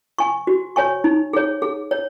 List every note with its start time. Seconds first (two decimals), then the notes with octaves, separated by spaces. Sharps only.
0.19 G#5 C#6
0.47 F#4
0.76 C#5 G#5 C#6
1.04 D#4
1.33 G#4 C#5
1.62 G#4
1.91 C#5